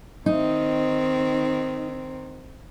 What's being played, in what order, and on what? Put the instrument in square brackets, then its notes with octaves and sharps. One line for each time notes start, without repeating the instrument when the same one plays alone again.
[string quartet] D#3 C4 [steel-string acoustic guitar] D#4